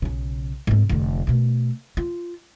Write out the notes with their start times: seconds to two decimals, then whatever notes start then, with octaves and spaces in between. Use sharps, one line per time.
0.02 B1 C#3
0.67 G#2 C4
0.89 F1 D3
1.27 B2 A3
1.97 F4